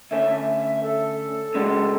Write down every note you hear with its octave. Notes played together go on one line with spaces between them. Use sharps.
D2 D3 A3 C#4 E5
E5
A4
C#3 G#3 D4 F#4